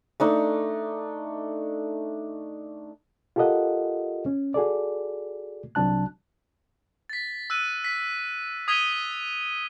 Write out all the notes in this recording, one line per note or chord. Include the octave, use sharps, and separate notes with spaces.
A3 D4 D#4
F4 G4 A4 A#4 D#5 F#5
C#4
F#4 G#4 A4 D5
C2 C3 F#3 D4 A5 F#6
A6 B6
E6 F#6 D#7
B6
D#6 G#6 B6 D#7 F7 G7
D#6